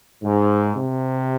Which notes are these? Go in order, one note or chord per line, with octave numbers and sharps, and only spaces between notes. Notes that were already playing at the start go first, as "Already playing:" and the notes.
G#2
C3